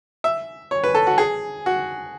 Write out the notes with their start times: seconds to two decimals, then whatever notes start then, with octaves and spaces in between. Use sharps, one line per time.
0.24 E5
0.71 C#5
0.84 B4
0.95 A4
1.07 F#4
1.18 G#4
1.66 F#4